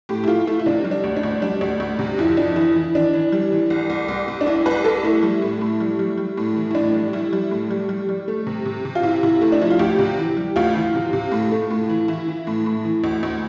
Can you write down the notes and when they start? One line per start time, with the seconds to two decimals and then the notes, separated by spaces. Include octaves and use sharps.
0.09 A2 G4
0.24 E4
0.28 A3 F4
0.47 A3 E4
0.59 E4
0.66 C3 D4
0.84 G3
0.91 D4
1.04 D2
1.16 D4
1.23 D2
1.42 G3 D4
1.61 D2
1.80 D2
1.99 C3
2.18 F2 E4
2.37 F2 D4
2.56 E3 E4
2.76 E3
2.95 E3 D4
3.13 E3
3.32 G3
3.52 E3
3.70 C2
3.90 C2
4.08 C2
4.28 C2
4.41 D4
4.46 C2 E4
4.66 C2 B4
4.84 C2 A4
5.03 A3 E4
5.23 G3
5.42 A2
5.61 A2
5.80 G3
5.99 G3
6.18 G3
6.37 A2
6.56 E3
6.71 E4
6.75 A2 D4
6.95 G3
7.13 G3 E4
7.33 G3
7.51 A2
7.71 G3
7.89 G3
8.09 G3
8.28 A3
8.47 C3
8.66 C3
8.85 C3
8.95 F4
9.03 C3 E4
9.23 C3 E4
9.41 A3 E4
9.52 D4
9.61 F3 E4
9.70 F4
9.79 D2 G4
9.99 C3
10.18 E3
10.37 G3
10.56 D2 F4
10.75 E3
10.95 C3
11.13 C3
11.32 A2
11.52 A3
11.71 A2
11.89 E3
12.08 E3 E4
12.28 E3
12.47 A2
12.66 A2
12.85 E3
13.04 D2
13.23 D2